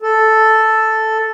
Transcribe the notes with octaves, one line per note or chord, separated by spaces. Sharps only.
A4